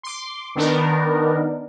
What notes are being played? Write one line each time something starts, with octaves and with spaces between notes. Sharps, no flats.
C6 D6
D#3 B3 D4 D#4 A#4